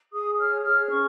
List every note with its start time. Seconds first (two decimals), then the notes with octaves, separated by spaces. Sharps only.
0.13 G#4 D#6
0.38 C#5 F6
0.64 G#4 F6
0.89 C#4 C#6